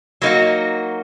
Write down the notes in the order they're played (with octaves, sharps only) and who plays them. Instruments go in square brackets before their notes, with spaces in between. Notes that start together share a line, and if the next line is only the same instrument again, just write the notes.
[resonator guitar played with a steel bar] F#3 A#3 D#4 F#4